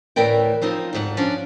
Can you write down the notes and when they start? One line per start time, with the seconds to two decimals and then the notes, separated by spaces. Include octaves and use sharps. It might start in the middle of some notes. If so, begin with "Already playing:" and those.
0.16 D2 A2 E3 A#4 D5 G5
0.61 F3 C4 D#4 F4
0.93 D2 G#2 F#5
1.17 F3 C#4 D4